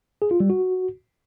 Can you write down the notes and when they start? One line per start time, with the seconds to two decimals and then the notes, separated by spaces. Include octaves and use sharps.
0.22 G#4
0.31 F4
0.40 G3
0.50 F#4